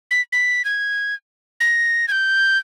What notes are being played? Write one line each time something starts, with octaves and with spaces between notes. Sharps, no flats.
B6
B6
G#6
A#6
G#6
G6